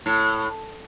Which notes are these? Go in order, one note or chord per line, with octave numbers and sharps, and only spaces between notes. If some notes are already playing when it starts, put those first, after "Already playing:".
A2